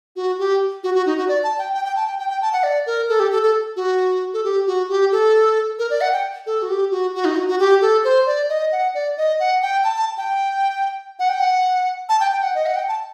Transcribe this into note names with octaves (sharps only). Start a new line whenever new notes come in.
F#4
G4
F#4
F#4
D#4
F#4
D5
A5
G5
G5
G5
A5
G5
G5
G5
A5
F#5
D5
A#4
A4
G4
A4
A4
F#4
A4
G4
F#4
G4
A4
A#4
D5
F#5
G5
A4
F#4
G4
F#4
F#4
D#4
F#4
F#4
G4
A4
C5
D5
D#5
F#5
D5
D#5
F#5
G5
A5
A5
G5
F#5
G5
F#5
A5
G5
G5
F#5
D#5
F#5
G5
A5